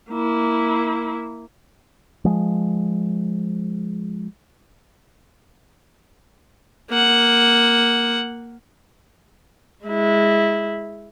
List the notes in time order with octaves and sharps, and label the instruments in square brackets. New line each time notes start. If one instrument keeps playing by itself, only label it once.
[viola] A#3 E4
[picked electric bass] F3 G#3
[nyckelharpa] A#3 F#5
[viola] G#3 E4